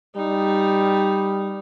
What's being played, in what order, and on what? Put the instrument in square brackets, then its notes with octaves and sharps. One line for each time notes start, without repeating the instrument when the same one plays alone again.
[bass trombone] G3 [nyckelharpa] D#4